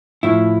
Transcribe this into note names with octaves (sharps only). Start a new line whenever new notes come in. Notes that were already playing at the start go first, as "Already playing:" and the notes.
A2 F3 E4